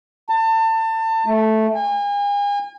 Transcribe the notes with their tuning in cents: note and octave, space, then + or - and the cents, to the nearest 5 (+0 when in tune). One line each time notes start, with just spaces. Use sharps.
A5 +30
A3 -5
G#5 -40